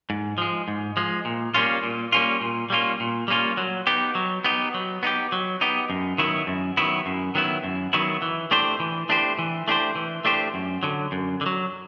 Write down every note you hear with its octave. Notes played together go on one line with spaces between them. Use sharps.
G#2
F3 G#3
G#2
F3 G#3
A#2
G3 A#3 C#4 F4
A#2
G3 A#3 C#4 F4
A#2
G3 A#3 C#4 F4
A#2
G3 A#3 C#4 F4
F#3
B3 D#4 G4
F#3
B3 D#4 G4
F#3
B3 D#4 G4
F#3
B3 D#4 G4
F#2
D#3 F#3 B3 E4
F#2
D#3 F#3 B3 E4
F#2
D#3 F#3 B3 E4
F#2
D#3 F#3 B3 E4
E3
A3 D4 G4 C5
E3
A3 D4 G4 C5
E3
A3 D4 G4 C5
E3
A3 D4 G4 C5
F#2
D3 F#3
F#2
D3
F#3